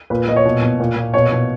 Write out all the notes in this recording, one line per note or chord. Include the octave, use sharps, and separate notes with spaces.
A#2 B4
A#2 D#5
C#5
B2
B2
A#2
A#2
B2 C#5
B2